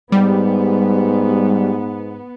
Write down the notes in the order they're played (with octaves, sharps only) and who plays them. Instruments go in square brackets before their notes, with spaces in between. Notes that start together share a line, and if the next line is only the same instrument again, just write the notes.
[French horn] G#2 [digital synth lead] G3 [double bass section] B3